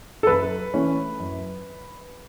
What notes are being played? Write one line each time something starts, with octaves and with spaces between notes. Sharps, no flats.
A4
F#2 B4
E3 A3 C#4
F#2